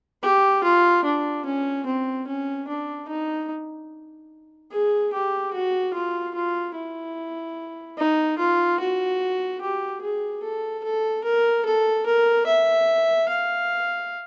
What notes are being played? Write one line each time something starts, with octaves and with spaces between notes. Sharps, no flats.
G4
F4
D4
C#4
C4
C#4
D4
D#4
G#4
G4
F#4
F4
F4
E4
D#4
F4
F#4
G4
G#4
A4
A4
A#4
A4
A#4
E5
F5